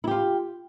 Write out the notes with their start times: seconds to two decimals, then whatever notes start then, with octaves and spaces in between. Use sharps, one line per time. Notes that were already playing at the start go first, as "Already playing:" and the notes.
0.04 E4
0.07 G4
0.11 F4